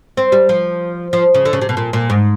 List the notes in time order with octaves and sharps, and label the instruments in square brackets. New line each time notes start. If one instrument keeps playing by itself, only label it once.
[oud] C4
G3
F3
F3
C#3
D3
C#3
C3
B2
A#2
A#2
G#2